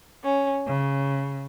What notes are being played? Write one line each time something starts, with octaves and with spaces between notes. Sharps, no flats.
C#4
C#3